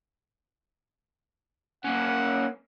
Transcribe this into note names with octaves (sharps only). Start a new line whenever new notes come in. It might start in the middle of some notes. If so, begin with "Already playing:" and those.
A#3 C#4 F#5